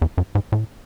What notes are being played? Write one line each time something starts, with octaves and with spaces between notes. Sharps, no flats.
E2
F#2
G#2
A2